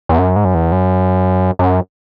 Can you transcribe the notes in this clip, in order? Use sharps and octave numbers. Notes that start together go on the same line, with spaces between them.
E2
F#2
G#2
F#2
E2
F#2
F#2